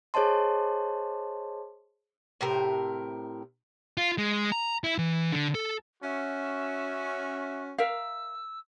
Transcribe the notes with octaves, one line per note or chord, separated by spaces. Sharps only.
G#4 C5 C#5 D#5 A5 C6
A2 C3 A#4
F4
G#3
A#5
E4
E3
D3
A4
C#4 F#4 E5
A#4 E5 F5 E6